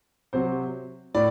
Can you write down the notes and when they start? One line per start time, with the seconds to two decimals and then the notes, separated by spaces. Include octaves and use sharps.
0.33 C3 F#3 C5
1.14 A2 D5